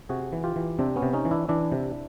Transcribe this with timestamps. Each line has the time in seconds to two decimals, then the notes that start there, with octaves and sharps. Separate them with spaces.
0.09 C3 F#4 G#4
0.32 E3
0.44 F4 G4
0.56 E3
0.79 C3 C4 D4
0.96 B3 C#4
1.02 C3
1.13 C#4 D#4
1.25 E3
1.31 D4 E4
1.49 E3 D4 E4
1.72 C3